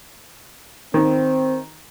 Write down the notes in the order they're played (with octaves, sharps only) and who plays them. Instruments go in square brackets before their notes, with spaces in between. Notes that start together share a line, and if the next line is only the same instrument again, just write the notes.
[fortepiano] D#3 [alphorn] C4